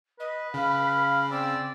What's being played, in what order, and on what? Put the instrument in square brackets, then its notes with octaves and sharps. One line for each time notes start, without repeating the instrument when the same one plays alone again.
[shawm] B4 [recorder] D#5
[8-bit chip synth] C#3 [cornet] F5 [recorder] B5
[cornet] C4 [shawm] D5 [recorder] E6